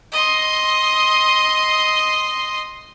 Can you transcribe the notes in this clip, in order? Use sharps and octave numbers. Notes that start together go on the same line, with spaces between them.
D#5 C6